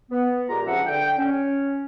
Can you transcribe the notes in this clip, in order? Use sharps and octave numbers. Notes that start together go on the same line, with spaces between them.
B3
A#2 G#3 F4 G4 A#5
C#2 C3 F3 D4 E5 F#5
D3 G5
C#4